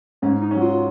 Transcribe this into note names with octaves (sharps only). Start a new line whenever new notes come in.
G#2 C#4
D#4
F#3 C#4
F4